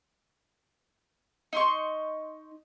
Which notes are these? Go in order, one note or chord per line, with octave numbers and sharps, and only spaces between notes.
D#4 C6 C#6